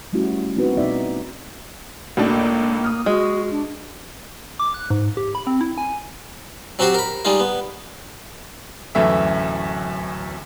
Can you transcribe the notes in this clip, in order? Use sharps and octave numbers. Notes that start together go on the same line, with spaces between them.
G3 A3 C#4 E4 F#4
B3 C4 D#4 E4 F#4 B4
B2 B3 D#4 D5 E5
C#2 A2 A#3 D4
D#6 F6
G#3 F#4
D4
D6
F#6
G#2
G4
B5
C4
E4
G#5
F#3 C4 F#4 G4 C5
A#4 B5
G3 G#3 D#4 F4
B3
D1 F#2 E3 A3 E5